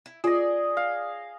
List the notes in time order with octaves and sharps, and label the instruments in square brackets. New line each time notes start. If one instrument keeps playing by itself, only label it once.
[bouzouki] E4
[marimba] F4 [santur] G#4 D#5 [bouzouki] D5
[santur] F5